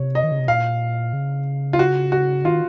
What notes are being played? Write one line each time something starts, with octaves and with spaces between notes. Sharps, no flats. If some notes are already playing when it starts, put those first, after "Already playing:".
Already playing: C3 C#5
D#5
D#3
C#3
C3
A#2 F5
C#3
F4
F#4
F#4
D#3 F4